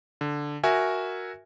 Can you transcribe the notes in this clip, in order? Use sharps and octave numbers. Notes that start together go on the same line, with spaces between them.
D3
F#4 A#4 E5 G#5